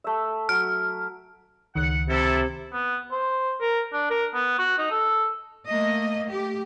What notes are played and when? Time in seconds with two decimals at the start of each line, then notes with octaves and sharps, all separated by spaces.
0.04 A3 E5
0.49 F#3 F6
1.75 C#2 D#3 F#5
2.08 C3 E4 A4
2.73 B3
3.12 C5
3.61 A#4
3.93 D4
4.10 A#4
4.34 B3
4.59 F#4
4.78 D#4
4.91 A4
5.67 A3 A#3 D#5
6.30 A3 G4